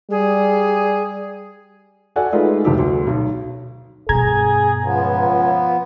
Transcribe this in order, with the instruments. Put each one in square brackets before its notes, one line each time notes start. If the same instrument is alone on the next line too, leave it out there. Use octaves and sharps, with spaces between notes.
[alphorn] G3 [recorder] G#4
[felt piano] F#4 A4 D5 F#5 G#5
G#3 A3 D#4 F4 B4 D5
F1 D2 G3 G4 A4
D2
B1
[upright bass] G2 B2 [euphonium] G#4 [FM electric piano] A#5 G#6
[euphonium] C#2 [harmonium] F3 B3